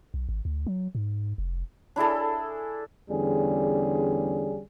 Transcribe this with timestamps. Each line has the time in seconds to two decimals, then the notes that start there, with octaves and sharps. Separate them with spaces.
0.14 B1
0.29 G#1
0.45 D2
0.67 F#3
0.95 G#2
1.38 F1
1.96 D4 E4 G#4 A4
3.09 E2 D3 G3 C#4 G#4